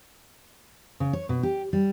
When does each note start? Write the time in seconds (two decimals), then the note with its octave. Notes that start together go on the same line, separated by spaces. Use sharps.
1.00 C#3
1.13 C#5
1.29 B2
1.43 G4
1.73 G3